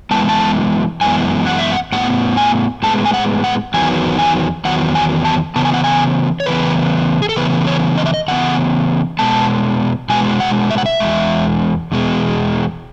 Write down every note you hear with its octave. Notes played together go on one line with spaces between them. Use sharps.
F#2 E3 G#3 B3 A5
A5
F#2 E3 G#3 B3 G#5
F#5
E5
F#5
A2 G#3 B3 F#5
G#5
A2 G#3 B3 A5
G#5
F#5
F#5
E2 D#3 F#3 B3 G#5
G#5
E2 D#3 F#3 B3 F#5
G#5
A5
C#3 E3 B3 A5
G#5
F#5
G#5
C#5
C#3 E3 B3 B4
G#4
A4
C#3 E3 B3 B4
C#5
D#5
E5
D#5
C#3 E3 B3 F#5
B2 G#3 B3 A5
B2 G#3 B3 G#5
F#5
E5
F#5
E5
E2 B2 G#3
E2 B2 G#3